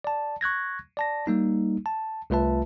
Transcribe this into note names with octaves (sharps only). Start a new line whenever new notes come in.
D5 A5
C#6 F#6 G#6 A#6
D5 A5 A#6
G3 A#3 D#4
A5
C2 A3 F4 B4 E5 A5